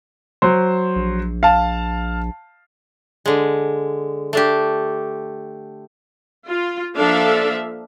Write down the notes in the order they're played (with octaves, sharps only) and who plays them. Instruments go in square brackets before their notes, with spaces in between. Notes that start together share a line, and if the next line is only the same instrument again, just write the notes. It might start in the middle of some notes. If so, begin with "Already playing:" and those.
[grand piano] F#3 C5
[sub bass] A#1
[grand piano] F5 A5
[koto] D3 G#3
A3 D4 G4
[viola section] F4
F3 A#3 D4 A4 E5 F5